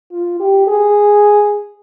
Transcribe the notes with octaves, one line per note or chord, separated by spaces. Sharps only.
F4
G4
G#4